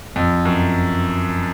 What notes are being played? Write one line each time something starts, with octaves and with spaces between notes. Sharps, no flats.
F2
F#2